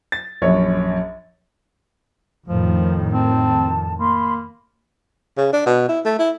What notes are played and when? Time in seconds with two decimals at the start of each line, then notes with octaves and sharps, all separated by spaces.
0.12 A6
0.42 A#1 F#2 C#5
2.48 F2 A2 D#3 F3
3.13 C4 A5
3.98 A#3 B5 C6
5.37 C#3
5.53 D4
5.66 B2
5.89 E4
6.05 A3
6.19 E4